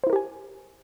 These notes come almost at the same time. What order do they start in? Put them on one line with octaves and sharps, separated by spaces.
C5 E4 A#4 G4 G#5